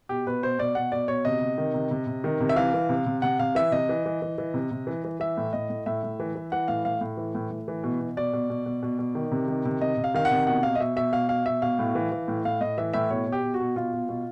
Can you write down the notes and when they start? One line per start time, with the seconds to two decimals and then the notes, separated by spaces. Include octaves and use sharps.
0.09 B2 G4
0.27 B2 B4
0.43 B2 C5
0.59 B2 D5
0.75 B2 F#5
0.92 B2 D5
1.08 B2 C#5
1.25 C3 D#5
1.41 C3
1.58 D#3
1.74 C3
1.91 C3
2.07 C3
2.24 D#3
2.40 C3
2.49 E5
2.56 E3 F5
2.74 E3
2.89 C3
3.06 C3
3.22 C3 F#5
3.39 C3 F5
3.55 E3 E5
3.72 C3 D#5
3.89 E3
4.06 E3
4.22 E3
4.38 E3
4.54 C3
4.71 C3
4.87 E3
5.04 E3
5.20 E3 E5
5.37 A2
5.53 A2 D#5
5.70 A2
5.86 A2 E5
6.03 A2
6.20 E3
6.35 E3
6.52 E3 F#5
6.68 A2 F5
6.84 A2 F5
7.01 A2
7.17 E3
7.35 A2
7.51 A2
7.68 E3
7.84 B2
8.01 B2
8.17 B2 D5
8.33 B2
8.50 B2
8.66 B2
8.83 B2
8.99 B2
9.15 D#3
9.32 C3
9.48 D#3
9.65 C3
9.81 C3 D#5
9.97 C3
10.04 F5
10.14 D#3 F5
10.25 F#5
10.31 C3
10.47 B2 F#5
10.63 B2 F5
10.75 D#5
10.80 B2 E5
10.96 B2 E5
11.13 B2 F5
11.29 B2 F5
11.46 B2 E5
11.62 B2 F5
11.79 A2
11.95 E3
12.12 E3
12.28 A2
12.45 A2 F5
12.61 A2 D#5
12.78 E3 E5
12.94 A2 E5
13.11 B2 C#5
13.27 B2
13.32 G4
13.43 B2
13.54 F#4
13.60 B2
13.76 B2 F4
13.93 B2
14.09 B2